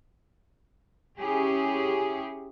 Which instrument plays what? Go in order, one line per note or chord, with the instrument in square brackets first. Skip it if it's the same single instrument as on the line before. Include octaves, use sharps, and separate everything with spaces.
[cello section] C#4 E4 G4 G#4